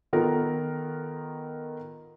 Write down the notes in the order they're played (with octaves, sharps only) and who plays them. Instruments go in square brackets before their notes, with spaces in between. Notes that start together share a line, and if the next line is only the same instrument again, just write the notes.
[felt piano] D#3 B3 F4 A4 A#4